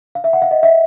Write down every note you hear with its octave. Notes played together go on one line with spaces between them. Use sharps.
F5
E5
F#5
F5
D#5
E5